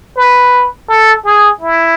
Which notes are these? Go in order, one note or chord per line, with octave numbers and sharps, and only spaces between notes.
B4
A4
G#4
E4